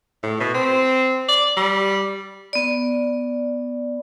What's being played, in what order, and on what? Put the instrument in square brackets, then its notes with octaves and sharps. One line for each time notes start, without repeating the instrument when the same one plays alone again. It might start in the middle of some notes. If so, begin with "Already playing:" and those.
[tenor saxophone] A2
B2
C4
D5
G3
[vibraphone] B3 D5